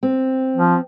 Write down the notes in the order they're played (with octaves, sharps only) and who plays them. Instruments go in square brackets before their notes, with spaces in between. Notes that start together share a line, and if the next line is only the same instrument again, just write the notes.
[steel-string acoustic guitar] C4
[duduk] F3